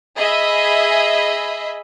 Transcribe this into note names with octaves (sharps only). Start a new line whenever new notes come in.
G#4 D#5 E5 B5